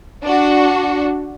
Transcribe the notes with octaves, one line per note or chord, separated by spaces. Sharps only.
D4 F#4